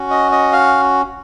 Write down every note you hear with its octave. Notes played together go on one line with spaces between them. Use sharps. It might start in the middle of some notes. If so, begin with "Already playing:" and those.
Already playing: C#4 F#4
D#5
D#5
F5